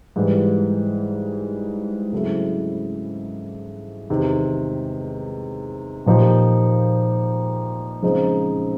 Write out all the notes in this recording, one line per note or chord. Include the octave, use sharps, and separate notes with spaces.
G#2 E3 G3
C#3 F#3 A3 C4 E4
E2 C3 D#3
A#2 F3 A#3 D#4 G4
C#3 F3 G#3 C4 D#4